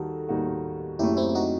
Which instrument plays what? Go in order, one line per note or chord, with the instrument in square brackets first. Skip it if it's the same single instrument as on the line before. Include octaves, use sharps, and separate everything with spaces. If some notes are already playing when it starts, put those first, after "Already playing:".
Already playing: [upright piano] D#2 D#3 G3 D#4 F#4 [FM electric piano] A4
[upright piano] D#2 D#3 G3 D#4 F#4
[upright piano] F#1 F#2 F#3 A3 [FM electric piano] E4 G4
[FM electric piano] C4 E4
E4
D#4 F#4